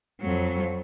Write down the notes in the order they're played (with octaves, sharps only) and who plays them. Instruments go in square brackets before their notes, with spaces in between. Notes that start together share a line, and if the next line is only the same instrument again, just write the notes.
[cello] F2 F#3